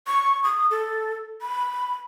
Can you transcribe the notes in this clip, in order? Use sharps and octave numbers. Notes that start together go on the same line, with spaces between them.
C#6
D#6
A4
B5